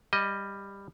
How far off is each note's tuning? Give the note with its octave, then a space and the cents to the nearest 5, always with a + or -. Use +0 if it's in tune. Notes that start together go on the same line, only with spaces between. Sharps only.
G3 +15 D#5 +0